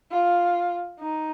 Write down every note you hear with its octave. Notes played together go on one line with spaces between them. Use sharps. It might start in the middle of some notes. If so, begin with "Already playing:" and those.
F4
D#4